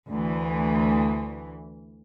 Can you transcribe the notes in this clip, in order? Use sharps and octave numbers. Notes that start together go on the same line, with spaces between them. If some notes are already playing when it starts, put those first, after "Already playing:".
D2 E3